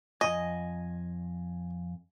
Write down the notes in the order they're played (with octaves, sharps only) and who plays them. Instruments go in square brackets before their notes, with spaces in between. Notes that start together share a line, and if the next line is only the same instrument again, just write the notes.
[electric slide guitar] F2 G#2 G#5 [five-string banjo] D#5